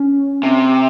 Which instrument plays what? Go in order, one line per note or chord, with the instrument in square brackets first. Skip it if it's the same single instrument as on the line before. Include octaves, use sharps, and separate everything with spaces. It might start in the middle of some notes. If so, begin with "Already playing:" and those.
Already playing: [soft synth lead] C#4
[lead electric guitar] C3